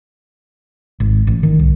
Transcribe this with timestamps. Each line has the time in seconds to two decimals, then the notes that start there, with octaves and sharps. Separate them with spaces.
1.00 G#1
1.27 A1
1.43 D#3
1.59 C2